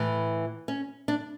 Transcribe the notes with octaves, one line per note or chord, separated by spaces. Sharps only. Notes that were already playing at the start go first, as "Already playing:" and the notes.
Already playing: A2 E3
C#4
D4